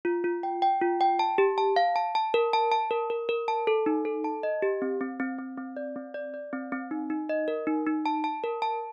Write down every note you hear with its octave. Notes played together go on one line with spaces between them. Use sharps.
F4
F4
G5
G5
F4
G5
A5
G4
A5
F5
A5
A5
A#4
A5
A5
A#4
A#4
A#4
A5
A4
D#4
A4
A5
D#5
G4
C4
C4
C4
C4
C4
D5
C4
D5
D5
C4
C4
D#4
D#4
D#5
A#4
D#4
D#4
A5
A5
A#4
A5